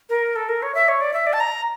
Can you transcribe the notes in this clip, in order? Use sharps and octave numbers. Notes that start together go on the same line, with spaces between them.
A#4
A4
A#4
C#5
E5
C#5
D5
E5
D5
A5
A#5